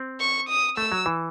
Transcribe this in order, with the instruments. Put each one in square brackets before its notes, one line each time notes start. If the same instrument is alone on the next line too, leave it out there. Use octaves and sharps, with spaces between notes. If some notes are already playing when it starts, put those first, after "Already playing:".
Already playing: [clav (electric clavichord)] C4
[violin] C#6
D#6
[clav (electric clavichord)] A3 [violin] E6
[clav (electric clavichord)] F#3
E3